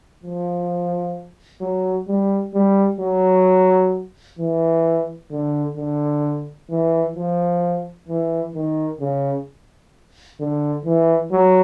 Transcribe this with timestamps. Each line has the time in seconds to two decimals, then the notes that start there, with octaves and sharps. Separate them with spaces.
0.23 F3
1.61 F#3
2.08 G3
2.54 G3
3.00 F#3
4.39 E3
5.32 D3
5.77 D3
6.70 E3
7.16 F3
8.08 E3
8.55 D#3
9.00 C#3
10.40 D3
10.85 E3
11.32 F#3